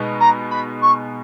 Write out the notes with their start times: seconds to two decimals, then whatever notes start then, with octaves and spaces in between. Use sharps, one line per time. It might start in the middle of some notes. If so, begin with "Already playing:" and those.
Already playing: B2 G#3 B3 D#4
0.20 A#5
0.51 B5
0.82 C#6